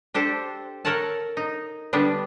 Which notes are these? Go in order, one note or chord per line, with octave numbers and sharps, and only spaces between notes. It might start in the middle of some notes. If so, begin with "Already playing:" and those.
D4 G4 A4 C5
A4 A#4 C#5 F#5 A5
D#4
D3 G3 B3 D4